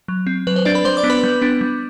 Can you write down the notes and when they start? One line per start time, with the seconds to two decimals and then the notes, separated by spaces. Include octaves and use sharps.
0.08 F#3
0.27 C4
0.47 F#3 B4
0.56 C5
0.65 C4 D4 D5
0.74 B4 B5
0.85 G3 C5 C6
0.97 D5 D6
1.04 B3 D4
1.10 B4 B5
1.23 G3
1.42 B3 D4
1.61 G3